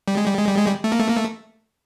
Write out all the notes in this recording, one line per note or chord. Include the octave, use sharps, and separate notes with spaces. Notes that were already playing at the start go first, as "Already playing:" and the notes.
G3
G#3
G3
G#3
G3
G#3
G3
A3
A#3
A3
A#3
A3